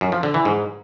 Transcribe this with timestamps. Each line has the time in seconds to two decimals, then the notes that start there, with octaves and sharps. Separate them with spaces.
0.01 F#2
0.12 F3
0.23 D3
0.34 E3
0.45 G#2